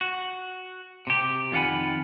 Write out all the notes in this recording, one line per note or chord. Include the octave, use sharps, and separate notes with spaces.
F#4
C3 G4
F2 D#3 F4 F#5 G#5 B5